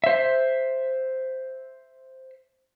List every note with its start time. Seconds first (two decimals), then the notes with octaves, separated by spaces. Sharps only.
0.04 C5 E5